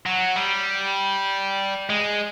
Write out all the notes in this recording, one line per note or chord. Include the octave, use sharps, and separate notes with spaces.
F#3
G3
G#3